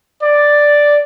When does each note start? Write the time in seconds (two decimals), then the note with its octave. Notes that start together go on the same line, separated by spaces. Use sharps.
0.22 D5